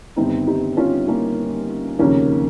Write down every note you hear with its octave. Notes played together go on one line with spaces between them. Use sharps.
G1 G2 D#3 C4 D#4
D#4 G4
C#4 F4
A#3 C#4
F1 D#2 C#3 F3 A#3 C#4